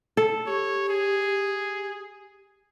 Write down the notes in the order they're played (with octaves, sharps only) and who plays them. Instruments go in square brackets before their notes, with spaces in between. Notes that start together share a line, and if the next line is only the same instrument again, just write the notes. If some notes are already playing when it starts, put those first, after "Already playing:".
[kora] A4
[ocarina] G4 [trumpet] C#5
[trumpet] G#4